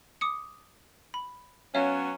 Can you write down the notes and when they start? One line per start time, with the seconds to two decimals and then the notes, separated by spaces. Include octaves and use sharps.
0.21 D6 D#6 C#7
1.14 B5
1.75 F#3 B3 C#4 C#5 E5 F5